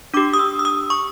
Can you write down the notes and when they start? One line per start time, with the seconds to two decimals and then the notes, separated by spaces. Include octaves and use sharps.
0.14 D4 G4 D6
0.34 D#6
0.39 E6
0.59 E6
0.65 D#6
0.90 C#6